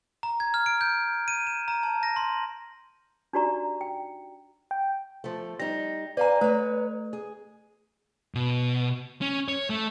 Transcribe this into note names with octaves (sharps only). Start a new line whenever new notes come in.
A#5
G#6
F6
D7
G6
D#7
E7
A#5
A5
A#6
C6
D4 D#4 F#4 G4 D5 A#5
G5
G5
F3 A3
G3 D#4 A#6
B4 D5 F5 G#5 A#5
A3 B4 C#5
G#4
B2
C#4
C#5
A3